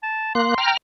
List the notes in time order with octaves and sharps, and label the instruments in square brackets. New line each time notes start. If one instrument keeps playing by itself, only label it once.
[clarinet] A5
[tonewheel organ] A#3 F#6 [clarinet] C6
[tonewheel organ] G5 A#5 F6